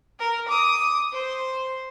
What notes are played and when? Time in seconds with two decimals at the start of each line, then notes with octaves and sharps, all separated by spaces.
0.20 A#4
0.48 D6 D#6
1.12 C5